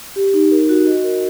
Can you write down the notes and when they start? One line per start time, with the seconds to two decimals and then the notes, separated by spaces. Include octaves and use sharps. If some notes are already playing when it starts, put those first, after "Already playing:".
0.16 G4
0.34 D#4
0.51 A#4
0.69 F#4
0.87 D#5
1.04 A#4